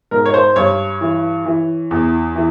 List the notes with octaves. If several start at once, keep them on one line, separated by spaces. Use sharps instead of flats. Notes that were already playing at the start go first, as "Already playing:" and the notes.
G#2 A#4
C#5
C5
G2 C#5
E3
E3
E2
E3